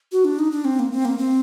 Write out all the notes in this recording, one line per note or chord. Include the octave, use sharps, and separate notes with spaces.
F#4
D4
D#4
D4
C4
A#3
C4
A#3
C4